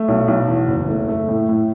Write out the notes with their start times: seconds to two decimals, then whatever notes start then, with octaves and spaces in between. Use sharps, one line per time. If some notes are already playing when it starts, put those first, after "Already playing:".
Already playing: A3
0.08 B1
0.28 B1
0.48 E2
0.68 F#1
0.88 A3
1.08 A3
1.28 A2
1.49 A2